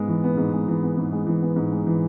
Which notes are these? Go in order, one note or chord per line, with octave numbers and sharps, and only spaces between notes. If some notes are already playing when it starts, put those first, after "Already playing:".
Already playing: G#2 G#3 B3
E3
B3
G#2
G#3
E3
B3
G#2
G#3
E3
B3
G#2
G#3
E3